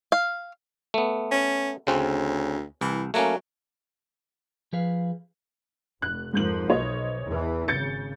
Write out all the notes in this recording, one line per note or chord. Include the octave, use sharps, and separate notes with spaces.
F5
A3 B3
C#4
D2 C#3 C4 C#4
C2 E3
F#3 A3 A#3 C#4
F3 G#4 B4 F5
F1 F#6
F2 G#2 F3 A#3 G6 F#7
B1 C5 C#5 D#5
E2 E3
G#1 C#3 G6 A6 C#7